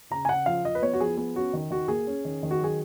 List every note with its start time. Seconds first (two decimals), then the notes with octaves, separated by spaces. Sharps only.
0.10 C#3 A#5
0.25 G#5
0.29 C#3 F#5
0.46 F3 F5
0.65 F3 D#5
0.75 B4
0.82 B3 C#5
0.94 F#4
1.00 F3 G#4
1.17 B3 G#4
1.35 C#4 F#4
1.53 D#3
1.71 D#3 F#4
1.88 A#3 G#4
2.07 C#4
2.25 D#3
2.43 D#3
2.51 F#4
2.60 F#3 G#4